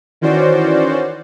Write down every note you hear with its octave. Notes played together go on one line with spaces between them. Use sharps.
D#3 E3 C#4 F#4 C5 D5